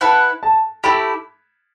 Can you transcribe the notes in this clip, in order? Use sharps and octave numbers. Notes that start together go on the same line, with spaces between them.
E4 B4 F#5 A5
A5
A3 E4 G4 B5